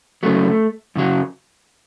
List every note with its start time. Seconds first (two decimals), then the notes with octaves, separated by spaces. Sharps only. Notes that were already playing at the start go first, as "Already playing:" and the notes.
0.23 F#2 C#3 F#3 A3
0.96 F#2 C#3 F#3